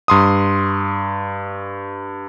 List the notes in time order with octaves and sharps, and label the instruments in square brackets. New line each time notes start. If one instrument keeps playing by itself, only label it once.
[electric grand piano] G2 C6 D#6